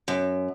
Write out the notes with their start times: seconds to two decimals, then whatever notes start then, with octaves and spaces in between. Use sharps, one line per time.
0.08 F#2